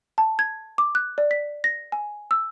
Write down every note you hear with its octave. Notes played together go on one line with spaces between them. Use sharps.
A5
G#6
D6
F#6
D5
B6
A#6
G#5
E6